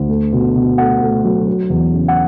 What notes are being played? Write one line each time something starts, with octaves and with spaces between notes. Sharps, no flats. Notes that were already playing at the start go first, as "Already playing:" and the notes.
Already playing: D2
A3
B2
B2
A3 F#5
A3
F#3
F#3
E2
C#3
F#5